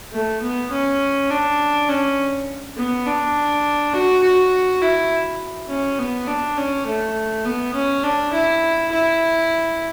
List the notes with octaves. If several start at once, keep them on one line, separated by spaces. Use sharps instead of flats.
A3
B3
C#4
D4
C#4
B3
D4
F#4
F#4
E4
C#4
B3
D4
C#4
A3
B3
C#4
D4
E4
E4